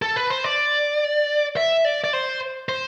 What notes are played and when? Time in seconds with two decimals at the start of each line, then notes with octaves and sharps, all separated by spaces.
0.02 A4
0.16 B4
0.30 C5
0.44 D5
1.57 E5
1.85 D5
2.04 D5
2.13 C5
2.69 C5